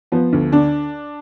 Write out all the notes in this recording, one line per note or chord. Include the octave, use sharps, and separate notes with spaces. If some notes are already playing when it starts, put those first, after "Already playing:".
F3 B3
D2
D3 D4